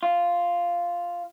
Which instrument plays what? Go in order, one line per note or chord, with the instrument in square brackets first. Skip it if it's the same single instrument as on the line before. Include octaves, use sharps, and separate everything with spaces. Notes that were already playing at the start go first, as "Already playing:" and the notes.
[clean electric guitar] F4